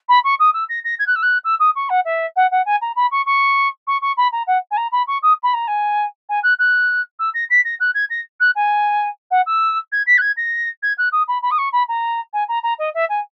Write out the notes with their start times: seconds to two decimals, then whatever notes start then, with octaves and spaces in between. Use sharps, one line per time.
0.09 B5
0.24 C#6
0.39 D#6
0.54 E6
0.69 A#6
0.84 A#6
0.99 G#6
1.07 F#6
1.15 E6
1.22 F#6
1.44 E6
1.60 D#6
1.76 C#6
1.89 F#5
2.05 E5
2.36 F#5
2.51 F#5
2.65 G#5
2.81 A#5
2.96 B5
3.11 C#6
3.26 C#6
3.87 C#6
4.01 C#6
4.17 B5
4.32 A#5
4.47 F#5
4.71 G#5
4.77 A#5
4.92 B5
5.07 C#6
5.22 D#6
5.43 B5
5.54 A#5
5.67 G#5
6.29 G#5
6.43 F#6
6.59 F#6
7.19 E6
7.34 A#6
7.50 B6
7.64 A#6
7.80 F#6
7.94 G#6
8.10 A#6
8.40 F#6
8.56 G#5
9.31 F#5
9.46 E6
9.92 G#6
10.07 B6
10.18 F#6
10.21 G#6
10.37 A#6
10.82 G#6
10.98 F#6
11.12 D#6
11.28 B5
11.42 B5
11.51 D#6
11.58 C#6
11.72 B5
11.88 A#5
12.33 G#5
12.48 A#5
12.63 A#5
12.79 D#5
12.94 E5
13.09 G#5